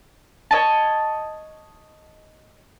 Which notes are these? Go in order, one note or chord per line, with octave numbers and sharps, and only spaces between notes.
C#5 D#5 A5